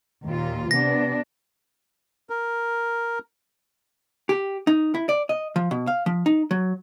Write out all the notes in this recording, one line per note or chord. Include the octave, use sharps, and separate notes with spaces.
D#2 A#2 F4
C3 B3 D4 A#6
A#4
G4
D#4
E4
D5
D#5
F3
B2
F5
F3
D#4
F#3